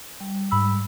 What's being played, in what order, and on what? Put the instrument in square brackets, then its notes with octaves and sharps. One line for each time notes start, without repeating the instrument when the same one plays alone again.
[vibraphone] G3
[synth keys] G#2 B5 E6